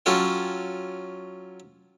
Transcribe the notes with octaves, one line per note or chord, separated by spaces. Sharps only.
F#3 C#4 F4 A4 G5